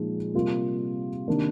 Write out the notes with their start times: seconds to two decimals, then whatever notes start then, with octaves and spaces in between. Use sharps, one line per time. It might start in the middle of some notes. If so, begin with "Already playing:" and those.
Already playing: A#2 F3 G#3 D#4
0.34 C3 G3 A#3 F4
1.28 C3 D#3 A#3 D4